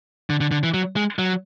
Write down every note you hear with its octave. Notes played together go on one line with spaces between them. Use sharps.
D3
D3
D3
E3
F#3
G#3
F#3